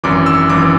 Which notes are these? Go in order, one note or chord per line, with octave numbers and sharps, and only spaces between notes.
G#1 F#2 E3 D6
E6
G#1 F#2 E3 D6